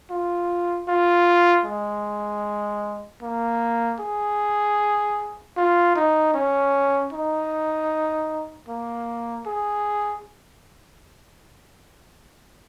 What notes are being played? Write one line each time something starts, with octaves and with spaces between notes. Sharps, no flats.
F4
F4
G#3
A#3
G#4
F4
D#4
C#4
D#4
A#3
G#4